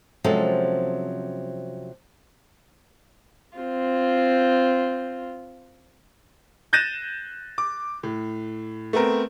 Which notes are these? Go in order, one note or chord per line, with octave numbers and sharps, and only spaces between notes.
C3 F3 F#3 G#3 C#4 A4
C4 F4
F#6 G6 A6 A#6 D#7 E7
D6
A2
A3 B3 C4 A#4